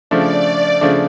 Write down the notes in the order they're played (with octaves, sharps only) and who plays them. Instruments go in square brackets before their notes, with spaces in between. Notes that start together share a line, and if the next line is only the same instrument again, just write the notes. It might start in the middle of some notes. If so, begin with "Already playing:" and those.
[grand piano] C#3 F3 A3 D4 [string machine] D5
[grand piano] C#3 F3 A3 D4